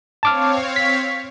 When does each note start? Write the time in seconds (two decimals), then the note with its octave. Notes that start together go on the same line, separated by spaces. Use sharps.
0.23 C4 C#5 F5 A5 D6 F6
0.76 B6